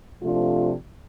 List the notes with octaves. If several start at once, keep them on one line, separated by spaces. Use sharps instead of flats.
C3 F3 A3 D4 F4